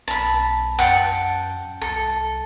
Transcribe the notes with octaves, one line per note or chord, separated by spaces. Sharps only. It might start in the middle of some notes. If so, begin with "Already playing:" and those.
B1 A5 B5
F#2 F#5 G5 A5
C2 A4